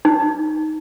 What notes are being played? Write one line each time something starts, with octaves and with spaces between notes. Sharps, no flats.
D#4